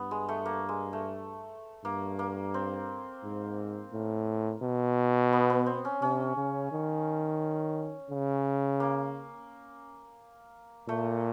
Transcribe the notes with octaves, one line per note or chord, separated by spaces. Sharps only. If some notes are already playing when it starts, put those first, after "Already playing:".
Already playing: G2 B3
G#3
A3
A#3
G#3
A3
G2 A#3
A#3
C4
G#2
A2
B2
B3
B3
C4
C#4
C3 C#4
C#3
D#3
C#3
A#3
A#2 A3